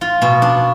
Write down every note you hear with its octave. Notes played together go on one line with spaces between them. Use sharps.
F4
B2
D4